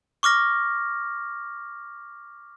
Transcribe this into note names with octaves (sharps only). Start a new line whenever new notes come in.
C#6 D6 F6 A#6